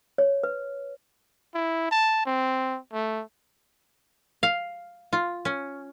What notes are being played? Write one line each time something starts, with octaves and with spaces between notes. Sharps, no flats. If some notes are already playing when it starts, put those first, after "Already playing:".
C#5
B4
E4
A5
C4
A3
F5
F4
C#4